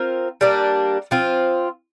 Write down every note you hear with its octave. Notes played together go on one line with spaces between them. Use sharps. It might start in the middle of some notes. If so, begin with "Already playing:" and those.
Already playing: C4 F4 A#4
G3 A#3 D4
F3 C4 F4